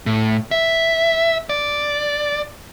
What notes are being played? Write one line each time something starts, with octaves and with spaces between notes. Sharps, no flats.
A2
E5
D5